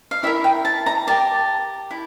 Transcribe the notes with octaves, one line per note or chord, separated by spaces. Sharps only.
F5
E4 G4 A#4 E5
G5
A5
A#5
G4 A#4 D5 A5
E4